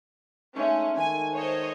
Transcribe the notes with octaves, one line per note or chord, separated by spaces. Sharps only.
G#3 A3 C#4 D#4
D#3 G#5
C5 C#5 D#5